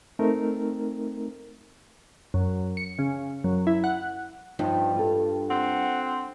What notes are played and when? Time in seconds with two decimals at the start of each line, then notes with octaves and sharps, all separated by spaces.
0.19 A3 C4 D#4 A#4
2.34 F#2
2.77 C#7
2.99 C#3
3.44 F#2
3.67 E4
3.84 F#5
4.59 G2 F3 D#4
4.96 F4 A4
5.50 C4 F#5